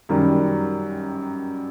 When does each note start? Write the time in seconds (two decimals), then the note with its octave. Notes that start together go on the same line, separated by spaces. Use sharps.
0.09 F#2 D#3 G3